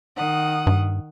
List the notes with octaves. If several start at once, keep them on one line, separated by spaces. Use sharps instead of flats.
D#3 F#5 D#6
G2